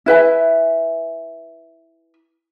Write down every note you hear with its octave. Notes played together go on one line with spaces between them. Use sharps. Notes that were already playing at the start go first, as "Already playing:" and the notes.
E4 B4 E5 G#5